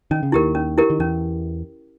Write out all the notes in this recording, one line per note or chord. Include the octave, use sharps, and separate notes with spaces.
D#3 C#4
C#3
D#2 D#3 E4 G4 A#4
C#4
E4 G4 A#4
D#3
E2 E3 C#4